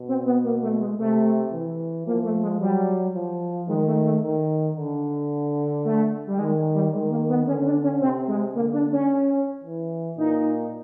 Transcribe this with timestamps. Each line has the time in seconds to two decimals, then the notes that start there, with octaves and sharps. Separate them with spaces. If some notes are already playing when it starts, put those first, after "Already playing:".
Already playing: B2
0.08 C4
0.26 B3
0.44 A#3
0.63 A3
0.80 G#3
0.98 C3 A3
1.53 E3
2.06 F3 A#3
2.24 A3
2.42 G#3
2.60 F#3 G3
3.14 F3
3.68 D#3 G#3
3.87 A3
4.05 A3
4.22 D#3
4.77 D3
5.85 A3
6.27 G3
6.39 D#3 G#3
6.74 G3
6.93 D#3 G#3
7.11 A#3
7.29 B3
7.47 D3 C#4
7.66 D4
7.83 C#4
8.01 C3 C4
8.28 G#3
8.55 D3 A#3
8.73 D4
8.92 C#4
9.63 E3
10.18 A#2 D#4